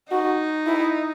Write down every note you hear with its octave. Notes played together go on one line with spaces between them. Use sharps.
D#4 F#4
E4